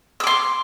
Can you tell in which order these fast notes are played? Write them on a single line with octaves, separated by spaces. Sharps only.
E6 D6 C6